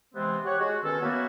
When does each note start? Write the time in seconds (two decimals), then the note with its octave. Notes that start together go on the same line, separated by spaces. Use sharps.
0.15 C3 E3 G#3 B3 C4
0.44 G4 C#5 F#5
0.58 G#3 F#4
0.82 B2 D#3 C#4 A4
1.01 F#3 A#3 B3 C#4 E4 F#4